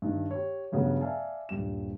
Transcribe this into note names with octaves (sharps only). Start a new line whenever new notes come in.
G2 D#3
G4 C#5
E2 G2 C#3 F#3 B3
D5 E5 F5 G#5 A5
D#1 G2 G3 E7